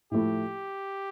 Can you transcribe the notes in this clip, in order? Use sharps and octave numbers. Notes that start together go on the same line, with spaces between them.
A2 F3 A3 E4 G4